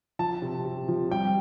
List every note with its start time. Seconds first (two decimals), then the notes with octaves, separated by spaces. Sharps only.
0.19 F3 A5
0.42 C3
0.65 C3
0.88 F3
1.11 G3 G5